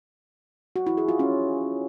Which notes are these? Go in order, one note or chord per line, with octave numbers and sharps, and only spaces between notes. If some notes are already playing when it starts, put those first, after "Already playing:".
F#4
E4
G#4
F4
C#4